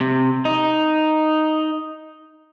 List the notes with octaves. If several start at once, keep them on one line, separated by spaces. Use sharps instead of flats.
C3
D#4